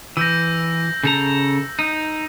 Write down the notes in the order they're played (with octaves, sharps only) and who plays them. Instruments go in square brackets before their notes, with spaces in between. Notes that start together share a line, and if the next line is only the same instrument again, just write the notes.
[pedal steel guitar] E3 [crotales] E6 G6 A#6
[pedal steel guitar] C#3 A4 A#5
D#4